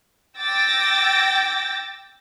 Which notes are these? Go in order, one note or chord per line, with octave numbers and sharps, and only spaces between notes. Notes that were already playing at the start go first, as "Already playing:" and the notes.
G5 D6 E6 A6 A#6